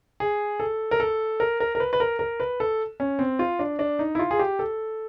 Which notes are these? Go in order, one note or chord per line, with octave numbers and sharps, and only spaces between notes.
G#4
A4
A#4
A4
A#4
A#4
A#4
B4
B4
A#4
A#4
B4
A4
C#4
C4
F4
D4
D4
D#4
E4
F4
G#4
G4
A4